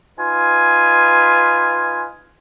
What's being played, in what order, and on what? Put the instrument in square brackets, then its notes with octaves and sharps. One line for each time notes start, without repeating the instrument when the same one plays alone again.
[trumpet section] D#4 F4 B4 G#5